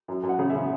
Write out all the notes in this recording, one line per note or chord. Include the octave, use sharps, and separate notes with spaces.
F#2
F#2
F#5
C#3
E5
C#3